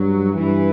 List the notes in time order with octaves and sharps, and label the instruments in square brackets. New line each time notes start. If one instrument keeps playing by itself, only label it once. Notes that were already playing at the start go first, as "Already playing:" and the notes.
Already playing: [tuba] G2 [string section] F#3
[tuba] G2 [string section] E3